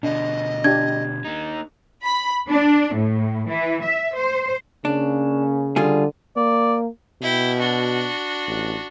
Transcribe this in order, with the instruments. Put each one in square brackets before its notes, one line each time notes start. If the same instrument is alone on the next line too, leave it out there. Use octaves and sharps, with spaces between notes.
[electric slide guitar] B2 D3 [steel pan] D4 [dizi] D#5
[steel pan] D4 G4 [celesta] G#6
[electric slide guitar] A#3 D#4
[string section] B5
D4
A2
E3
E5
C5
[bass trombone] C#3 [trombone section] A#3 C#4 [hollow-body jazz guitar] D4
[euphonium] D3 [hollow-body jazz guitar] G3 F4 G#4
[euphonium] A#3 [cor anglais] D5
[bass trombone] B2 [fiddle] E4 G5
[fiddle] D4 F#4
[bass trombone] A1